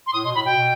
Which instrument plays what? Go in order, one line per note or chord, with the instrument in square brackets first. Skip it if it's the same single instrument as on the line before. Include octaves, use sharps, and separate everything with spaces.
[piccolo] C6
[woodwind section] A2 [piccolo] D#6
[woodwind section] B2 [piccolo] C6
[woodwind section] A2 [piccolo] B5
[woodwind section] B2 [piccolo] G5
[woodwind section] B2